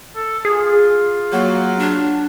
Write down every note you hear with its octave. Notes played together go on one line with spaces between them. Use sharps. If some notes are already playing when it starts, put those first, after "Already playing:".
A4
F4 G#4
F#3 A#3
D4